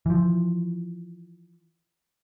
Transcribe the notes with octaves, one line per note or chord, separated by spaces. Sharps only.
E3 F3